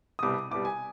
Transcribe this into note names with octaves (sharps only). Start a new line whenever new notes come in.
D#6
C2 B2 G3 D6
C2 B2 G3 D6
G#5